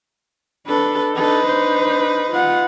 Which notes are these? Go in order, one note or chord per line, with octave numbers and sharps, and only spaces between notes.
D4 A4 B4
D4 D#4 A4 B4
D4 C5
F4 F#5